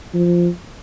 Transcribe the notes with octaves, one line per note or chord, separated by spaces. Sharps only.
F3